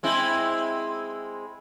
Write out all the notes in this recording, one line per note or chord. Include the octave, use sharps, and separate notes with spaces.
G#3 C4 E4